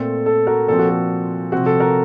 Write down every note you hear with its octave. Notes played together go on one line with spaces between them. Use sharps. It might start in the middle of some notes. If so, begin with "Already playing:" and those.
Already playing: A#2 A3 C4 A4
A4
F#4 A#4
A#2 F3 C4 A4
F#4
A4
C3 F3 C4 F#4
A4
F#4 A#4